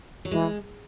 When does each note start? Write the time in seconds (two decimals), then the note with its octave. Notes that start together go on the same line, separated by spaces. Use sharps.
0.25 F#3
0.31 E3 G#3